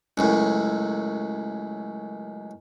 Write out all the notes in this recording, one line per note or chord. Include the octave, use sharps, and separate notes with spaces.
C#2 F#2 A2